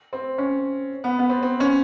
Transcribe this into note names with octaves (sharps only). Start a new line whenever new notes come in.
C4
C#4
B3
B3
C4
C4
C#4